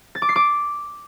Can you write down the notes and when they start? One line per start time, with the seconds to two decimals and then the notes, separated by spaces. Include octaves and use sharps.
0.15 A6
0.22 D6
0.29 C7
0.36 D6